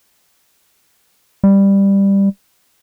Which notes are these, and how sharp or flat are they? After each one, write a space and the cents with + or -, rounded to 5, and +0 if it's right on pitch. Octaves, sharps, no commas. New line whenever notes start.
G3 +10